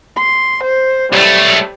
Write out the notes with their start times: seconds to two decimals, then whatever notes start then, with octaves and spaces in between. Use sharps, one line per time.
0.17 C6
0.64 C5
1.13 B1 G3 A3